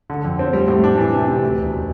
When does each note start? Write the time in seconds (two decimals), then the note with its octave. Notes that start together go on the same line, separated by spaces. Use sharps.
0.10 D3
0.24 F2
0.39 C4
0.53 G3
0.68 A2
0.84 D4
0.98 E3
1.13 C3
1.28 C3
1.43 D2
1.57 E1